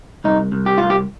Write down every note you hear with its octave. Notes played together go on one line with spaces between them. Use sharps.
C2 D#4
C2
G4
C2 F4
G4